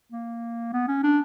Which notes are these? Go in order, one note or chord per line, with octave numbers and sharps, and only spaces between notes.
A#3
B3
C#4
D4